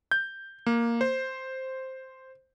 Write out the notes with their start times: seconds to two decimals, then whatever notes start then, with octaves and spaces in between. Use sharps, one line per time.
0.11 G6
0.66 A#3
1.01 C5